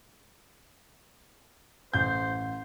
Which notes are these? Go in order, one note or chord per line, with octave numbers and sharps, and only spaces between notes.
A1 C5 G6